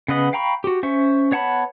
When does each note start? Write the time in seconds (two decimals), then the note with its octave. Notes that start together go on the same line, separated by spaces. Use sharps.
0.08 C#3 B3 B4 D#5 F#5
0.33 F5 G5 A#5 B5 C#6
0.64 F#4 G4
0.83 C#4 C5 E5 C#6
1.31 B3 C#5 F#5 A5 B5